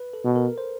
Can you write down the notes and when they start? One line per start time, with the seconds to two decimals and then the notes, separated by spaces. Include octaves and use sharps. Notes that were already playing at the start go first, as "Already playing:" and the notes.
Already playing: B4
0.13 A4
0.25 B2
0.36 A#4
0.58 C5